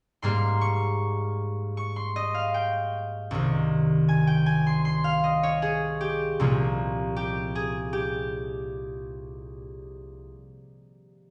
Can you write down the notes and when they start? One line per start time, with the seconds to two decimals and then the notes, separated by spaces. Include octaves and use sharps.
0.22 G#2 G3 A#3 C6
0.61 C#6
1.77 C#6
1.96 C6
2.16 D#5
2.34 F5
2.54 G5
3.31 C2 C3 D#3
4.08 G#5
4.27 G5
4.46 G#5
4.67 C6
4.85 C6
5.04 F5
5.24 D#5
5.43 C#5
5.62 G#4
6.01 G4
6.40 C2 A#2 F3 A#3
7.16 G4
7.55 G#4
7.93 G4